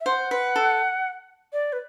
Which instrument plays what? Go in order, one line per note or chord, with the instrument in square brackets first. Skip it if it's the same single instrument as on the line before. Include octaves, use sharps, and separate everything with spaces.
[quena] E5
[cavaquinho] C5 [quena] F#5
[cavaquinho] B4
A4
[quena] D5
B4